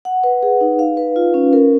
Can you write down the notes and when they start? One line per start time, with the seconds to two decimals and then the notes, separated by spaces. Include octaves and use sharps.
0.05 F#5
0.24 B4
0.43 G#4
0.61 D#4
0.79 F5
0.97 B4
1.16 F4
1.34 C#4
1.53 A#4